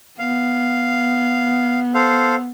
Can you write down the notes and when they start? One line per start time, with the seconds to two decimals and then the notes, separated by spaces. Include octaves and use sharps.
0.19 B3 F5
1.95 A4 C5 F5